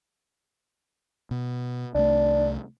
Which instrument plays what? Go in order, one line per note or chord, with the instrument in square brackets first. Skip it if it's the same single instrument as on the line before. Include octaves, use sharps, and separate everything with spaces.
[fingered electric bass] B2
[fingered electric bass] C2 A3 [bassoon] D4